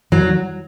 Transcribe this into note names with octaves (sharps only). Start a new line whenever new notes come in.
F#3